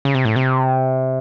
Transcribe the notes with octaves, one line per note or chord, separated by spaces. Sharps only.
C#3
C3
A2
C3